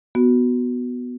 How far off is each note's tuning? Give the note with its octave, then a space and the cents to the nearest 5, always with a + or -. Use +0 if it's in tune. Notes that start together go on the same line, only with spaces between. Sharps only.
B3 +0 F#4 +0